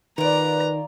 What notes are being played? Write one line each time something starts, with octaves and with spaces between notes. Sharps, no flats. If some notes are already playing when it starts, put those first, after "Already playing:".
D#3 F4 B4 D5 A#5